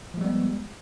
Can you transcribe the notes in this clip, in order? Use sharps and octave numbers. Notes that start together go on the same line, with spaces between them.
F3 G3 G#3 B3